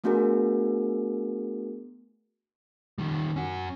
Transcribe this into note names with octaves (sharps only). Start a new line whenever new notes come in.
A3 B3 D4 F#4 G#4 A#4
D#3 G3
C#4 F#4